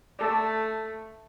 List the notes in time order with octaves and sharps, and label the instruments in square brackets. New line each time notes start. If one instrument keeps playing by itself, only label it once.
[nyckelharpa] A3 [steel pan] A4 D5